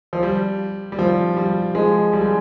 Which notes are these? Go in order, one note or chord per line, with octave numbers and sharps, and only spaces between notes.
F3
G3
G3
F3
G3
F3 G#3
G3
G#3